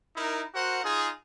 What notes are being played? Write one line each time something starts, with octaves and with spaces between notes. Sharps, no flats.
D#4 E4 A#4
F#4 A#4 C5 F#5
D#4 F4 G#4